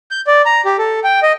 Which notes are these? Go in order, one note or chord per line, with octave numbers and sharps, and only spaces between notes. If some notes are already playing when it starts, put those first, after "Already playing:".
G6
D5
A#5
G4
A4
G5
D#5